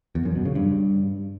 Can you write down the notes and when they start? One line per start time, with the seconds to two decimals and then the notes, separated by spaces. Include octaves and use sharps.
0.15 E2
0.25 F#2
0.35 B2
0.45 C#3
0.55 G2